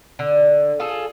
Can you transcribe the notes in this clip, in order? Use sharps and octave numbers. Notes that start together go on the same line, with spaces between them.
D3
F4 G#4 A4